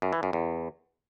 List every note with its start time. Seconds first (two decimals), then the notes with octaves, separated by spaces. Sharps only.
0.02 F#2
0.13 E3
0.23 F#2
0.33 E2